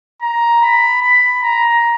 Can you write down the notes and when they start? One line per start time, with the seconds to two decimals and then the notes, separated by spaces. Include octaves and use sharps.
0.22 A#5
0.62 B5
1.02 B5
1.43 A#5